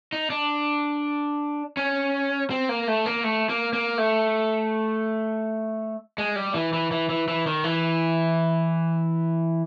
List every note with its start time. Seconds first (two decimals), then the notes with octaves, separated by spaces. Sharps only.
0.13 D#4
0.30 D4
1.77 C#4
2.50 C4
2.69 A#3
2.88 A3
3.06 A#3
3.24 A3
3.49 A#3
3.73 A#3
3.98 A3
6.18 G#3
6.36 G3
6.54 E3
6.73 E3
6.91 E3
7.09 E3
7.28 E3
7.47 D#3
7.64 E3